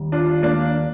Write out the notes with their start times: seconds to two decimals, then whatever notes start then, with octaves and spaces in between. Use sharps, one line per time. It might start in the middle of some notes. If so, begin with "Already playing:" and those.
Already playing: D#2 D#3 G3
0.12 D4 F4
0.43 A#3 D4